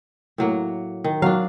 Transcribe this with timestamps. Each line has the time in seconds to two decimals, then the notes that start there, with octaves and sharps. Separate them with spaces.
0.38 A2 F#3 A#3
1.04 D#3
1.22 F#3 D4 F5